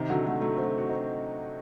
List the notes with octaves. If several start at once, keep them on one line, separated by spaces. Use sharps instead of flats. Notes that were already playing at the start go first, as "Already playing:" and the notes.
Already playing: C3 D#3
D3 F#3
F#3 A3
F#3 A3
A3 C4
F#4
C4 D#4